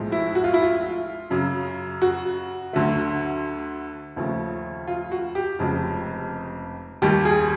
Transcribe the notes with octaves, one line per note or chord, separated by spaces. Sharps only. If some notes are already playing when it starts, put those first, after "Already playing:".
Already playing: B1 A2 F3 G#3
E4
F#4
F4
E4
F4
F#2 C#3 F#3
F#4
D2 D3 F#3 A3
D#2 C#3 F3 A3
F4
F#4
G4
F1 F2 C#3 F3 G#3
D#2 D#3 G3 G4
G#4